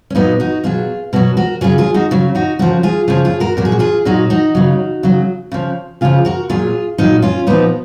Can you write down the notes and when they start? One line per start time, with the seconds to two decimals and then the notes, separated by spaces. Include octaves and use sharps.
0.10 C#4
0.15 A#2 F#3 B3 D#4
0.40 D#4 F#4
0.64 B2 F#3 F4 G#4
1.13 B2 F#3 F#4 A#4
1.37 F#4 A#4
1.61 C#3 F#3 F4 G#4
1.78 F4 G#4
1.94 D#4 F#4
2.11 C#3 F#3
2.35 D#4 F#4
2.59 C#3 F3 F#4 A#4
2.83 F4 G#4
3.08 C#3 F3 F4 G#4
3.25 F4 G#4
3.40 F#4 A#4
3.57 A#2 F#3 A#4
3.65 G#4
3.72 F#4
3.79 F4 G#4
4.05 A#2 F#3 D#4 F#4
4.30 D#4 F#4
4.55 C#3 F#3
5.03 C#3 F#3
5.52 C#3 F3
6.01 C#3 F3 F4 G#4
6.25 F#4 A#4
6.50 A#2 F#3 F4 G#4
6.98 A#2 F#3 D#4 F#4
7.22 C#4 F4
7.47 A#2 F3 B3 D#4